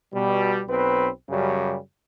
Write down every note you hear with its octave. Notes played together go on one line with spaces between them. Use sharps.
B2 G3
B1 C4 B4
F#2 C#3 G3